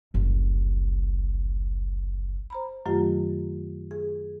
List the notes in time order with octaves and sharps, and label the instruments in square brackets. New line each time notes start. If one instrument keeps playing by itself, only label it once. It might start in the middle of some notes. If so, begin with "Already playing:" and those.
[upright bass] F#1 C2
[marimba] C5 A#5 B5
F#2 D#3 F#3 A3 F4 G4
G#4